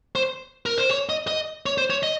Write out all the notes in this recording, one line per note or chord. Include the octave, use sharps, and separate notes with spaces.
C5
A#4
C5
C#5
D#5
D#5
C#5
C5
C#5
D#5